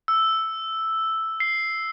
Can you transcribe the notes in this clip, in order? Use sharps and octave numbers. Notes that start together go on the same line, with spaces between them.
E6
C7